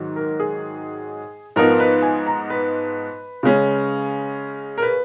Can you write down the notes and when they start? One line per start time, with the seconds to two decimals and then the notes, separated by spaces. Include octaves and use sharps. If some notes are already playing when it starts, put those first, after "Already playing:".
Already playing: G#2 D#3 F#3
0.16 A#4
0.40 G#4
1.56 G#2 F3 B3 D#4 A#4
1.80 B4
2.02 G#5
2.27 A#5
2.50 B4
3.43 C#3 G#3 C#4
4.78 A#4
4.83 B4